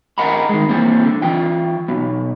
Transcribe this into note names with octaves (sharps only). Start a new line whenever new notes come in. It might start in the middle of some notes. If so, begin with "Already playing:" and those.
A#4 D#5 F#5 A#5 B5
D#3 G#3
E3 G3 A#3 C4
D3
E3 F4 G5
B1 B2